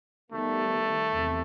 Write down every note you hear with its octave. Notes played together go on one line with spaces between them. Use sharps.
D#3 G3 A3 B3
E2 C3